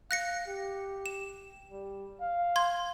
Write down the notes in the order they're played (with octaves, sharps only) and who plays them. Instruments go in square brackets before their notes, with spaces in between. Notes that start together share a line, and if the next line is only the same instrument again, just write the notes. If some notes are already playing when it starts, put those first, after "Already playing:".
[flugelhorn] F5 [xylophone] F#6 A#6 C#7
[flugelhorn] G4
[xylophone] E7
[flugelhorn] G3
F5
[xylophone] C6 G#6